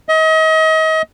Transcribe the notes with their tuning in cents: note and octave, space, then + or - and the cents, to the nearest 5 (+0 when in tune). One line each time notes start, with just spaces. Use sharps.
D#5 +35